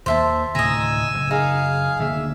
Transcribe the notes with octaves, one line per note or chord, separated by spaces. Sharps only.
D#2 A#3 C5 E5 A5
D2 A2 C3 D#5 G#5 A#5 E6
F#1
D#4 G#4 F5
D2 D3 A#3 E5